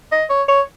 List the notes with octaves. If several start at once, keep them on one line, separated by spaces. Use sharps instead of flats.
D#5
C#5
C#5